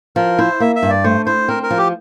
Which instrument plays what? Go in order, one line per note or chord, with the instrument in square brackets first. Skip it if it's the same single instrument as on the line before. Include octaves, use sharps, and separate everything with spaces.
[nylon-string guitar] F3 [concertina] A#4
[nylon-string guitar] E4 [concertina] C5
[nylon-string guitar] A#3 [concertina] E5
[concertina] E5
[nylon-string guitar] G2
[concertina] D5
[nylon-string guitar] A3 [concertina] C5
[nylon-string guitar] E4 [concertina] C5
[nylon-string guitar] C4 [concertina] A#4
[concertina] A#4
[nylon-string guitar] F3
[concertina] G4